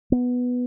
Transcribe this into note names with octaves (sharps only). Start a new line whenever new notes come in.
B3